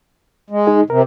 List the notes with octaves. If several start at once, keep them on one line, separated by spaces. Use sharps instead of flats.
G#3
D#4 G#4
C3 A#4